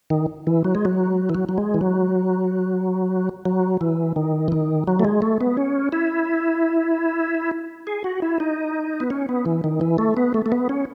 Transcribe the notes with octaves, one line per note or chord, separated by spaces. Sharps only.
D#3
E3
F#3
G#3
F#3
E3
F#3
F#3
G#3
E3
F#3
F#3
E3
D#3
E3
D#3
F#3
A3
G#3
A3
B3
C#4
E4
G#4
F#4
E4
D#4
B3
C#4
B3
E3
D#3
E3
A3
B3
A3
A3
B3
C#4